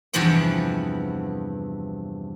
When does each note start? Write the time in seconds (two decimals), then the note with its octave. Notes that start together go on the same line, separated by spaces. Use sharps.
0.13 E2 G2 C3 F3 B3 F#5